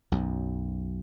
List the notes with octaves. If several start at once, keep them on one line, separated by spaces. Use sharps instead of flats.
B1 F#2